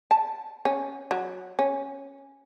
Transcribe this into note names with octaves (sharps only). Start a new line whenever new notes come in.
A5
C#4
F#3
C#4